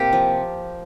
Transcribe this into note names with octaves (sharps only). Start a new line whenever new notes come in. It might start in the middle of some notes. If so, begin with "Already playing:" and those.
Already playing: C3 A#3 G4 A#4
F3